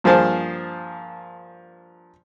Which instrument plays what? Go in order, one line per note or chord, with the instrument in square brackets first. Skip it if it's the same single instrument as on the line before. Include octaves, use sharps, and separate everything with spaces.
[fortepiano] G2 F3 A#3 G#4 C5 A5